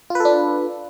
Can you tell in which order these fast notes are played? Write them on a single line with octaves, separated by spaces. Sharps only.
F4 B4 A4 D4